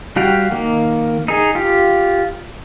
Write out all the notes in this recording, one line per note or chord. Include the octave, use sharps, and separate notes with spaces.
G3 F#4 G4 F5 G5
D#3 A#3
D#4 G#4
F4 G4